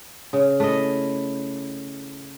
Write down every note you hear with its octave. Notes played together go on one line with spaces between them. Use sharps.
C#3
A3 E4 D#5